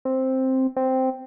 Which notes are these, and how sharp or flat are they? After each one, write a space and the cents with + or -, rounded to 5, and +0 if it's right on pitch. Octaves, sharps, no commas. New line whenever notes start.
C4 +5
C4 -5